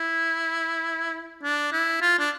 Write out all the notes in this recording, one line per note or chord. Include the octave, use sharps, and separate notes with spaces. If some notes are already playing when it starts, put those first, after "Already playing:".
Already playing: E4
D4
E4
F4
D4